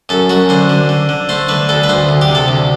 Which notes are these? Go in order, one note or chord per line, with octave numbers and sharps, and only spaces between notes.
F#2 A4
F#2 F#4
D3 C5
D3
D3
D3
A3 C5
D3 B4
D2 A4
B4
D2 C5
D2
G4
C3
A4
D2